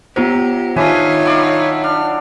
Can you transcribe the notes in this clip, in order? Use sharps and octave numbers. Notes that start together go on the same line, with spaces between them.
F#3 B3 F4 G4 C5
D#3 D4 D#4 F4 B4 C#5 E5 G#5
F#3 E4 D5
D4 F6